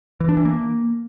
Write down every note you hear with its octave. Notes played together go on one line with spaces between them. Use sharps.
E3
D4
E3
A#3